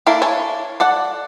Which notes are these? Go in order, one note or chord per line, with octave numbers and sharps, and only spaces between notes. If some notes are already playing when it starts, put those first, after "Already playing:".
A#3 D4 E4 A4 F5
A4 C#5 G#5
A4 D5 F#5